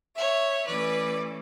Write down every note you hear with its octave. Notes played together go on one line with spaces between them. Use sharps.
C#5 E5
E3 A3 C#4 B4 D5